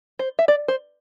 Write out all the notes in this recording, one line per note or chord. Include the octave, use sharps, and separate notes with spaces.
C5
E5
D5
C5